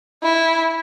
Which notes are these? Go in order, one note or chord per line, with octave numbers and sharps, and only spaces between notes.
E4